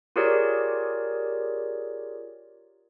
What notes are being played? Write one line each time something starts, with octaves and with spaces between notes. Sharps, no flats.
F4 G4 G#4 A#4 C#5 D5